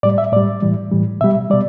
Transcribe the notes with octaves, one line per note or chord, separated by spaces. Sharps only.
A2 G3 D5
E5
A2 G3 D5
A2 E3 G3
A2 E3 G3
B2 G3 E5
B2 G3 D5